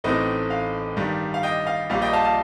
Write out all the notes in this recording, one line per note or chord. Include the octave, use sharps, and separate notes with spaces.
A1 A2 A3 C4 D#4 D#5
F5
G2 D#3 G3
F5
D#5 G5
F5
A#1 A#2 G3 F5
D#5 G5
F5 A5
F5 A5